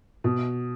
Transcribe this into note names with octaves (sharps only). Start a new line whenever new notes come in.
B2